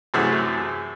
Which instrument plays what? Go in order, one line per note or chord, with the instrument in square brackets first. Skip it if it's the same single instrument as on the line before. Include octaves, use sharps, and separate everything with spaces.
[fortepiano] F#2 C3 E3 A3 F#4 G#4